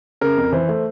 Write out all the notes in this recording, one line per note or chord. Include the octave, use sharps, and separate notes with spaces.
C#3 A#4
F2
E3 C5
A3